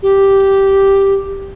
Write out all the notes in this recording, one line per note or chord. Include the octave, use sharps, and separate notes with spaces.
G4